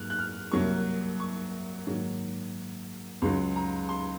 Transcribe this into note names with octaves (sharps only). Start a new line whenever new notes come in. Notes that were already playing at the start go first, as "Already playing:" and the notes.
Already playing: G#2 F#3 A#3 F6 F#6
F#6
F6
C2 C3 F#3 A#3 C#6
C#6
G#2 D#3 F#3 A#3
C#2 C#3 F#3 C6
A#5
C6